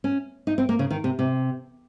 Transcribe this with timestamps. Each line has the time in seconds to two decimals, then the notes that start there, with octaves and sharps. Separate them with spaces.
0.04 C#4
0.47 D#4
0.58 C4
0.69 A#3
0.79 C#3
0.91 D#3
1.04 C3
1.19 C3